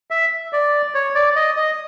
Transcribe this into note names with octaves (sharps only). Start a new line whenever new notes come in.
E5
D5
C#5
D5
D#5
D#5